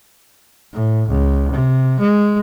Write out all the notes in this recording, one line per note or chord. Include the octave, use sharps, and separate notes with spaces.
A2
C#2
C3
G#3